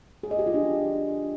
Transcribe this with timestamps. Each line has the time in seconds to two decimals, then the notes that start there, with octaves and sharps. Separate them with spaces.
0.23 G#4
0.31 D#5
0.39 G4
0.46 F4
0.54 D4